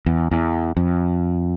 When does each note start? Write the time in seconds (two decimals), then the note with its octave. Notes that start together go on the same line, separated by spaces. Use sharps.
0.06 E2
0.31 E2
0.77 F2